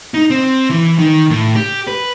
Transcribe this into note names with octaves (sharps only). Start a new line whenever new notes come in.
D#4
C4
E3
D#3
A2
G4
B4